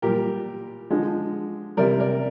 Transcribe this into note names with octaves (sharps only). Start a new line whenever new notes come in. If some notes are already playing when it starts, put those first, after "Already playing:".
A#2 G3 G4 A#4
D3 F3 G#3
C3 G3 A#4 D5
A#4 D5